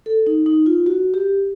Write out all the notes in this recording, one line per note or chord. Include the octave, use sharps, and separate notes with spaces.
A4
D#4
D#4
F4
F#4
G4